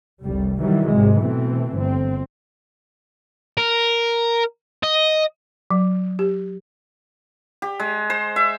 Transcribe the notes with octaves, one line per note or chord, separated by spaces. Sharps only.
F1 C2 G3
D#3 E3 F#3 G3
G#1 C3 G#3
B2 E3 A3 C4
G1 C4
A#4
D#5
F#3
G4
G4
G#3
C5
E5